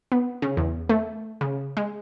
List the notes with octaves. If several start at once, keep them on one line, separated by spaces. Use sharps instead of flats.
B3
C#3
E2
A3
C#3
G#3